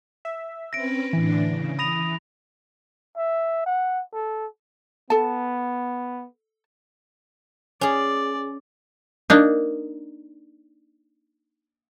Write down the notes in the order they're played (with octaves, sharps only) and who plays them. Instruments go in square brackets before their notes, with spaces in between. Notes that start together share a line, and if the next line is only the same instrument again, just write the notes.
[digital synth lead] E5
[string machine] C4 C#4 B4 [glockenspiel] A#6 D7
[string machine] A2 D3 D4 [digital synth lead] E3
[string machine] C#3
[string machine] E3 [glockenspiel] B5 A#6 F7 [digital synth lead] D#6
[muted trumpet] E5
F#5
A4
[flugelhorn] B3 [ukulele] A4 A5
[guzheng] C#4 G#4 [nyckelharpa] D5
[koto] A#3 D4 D#4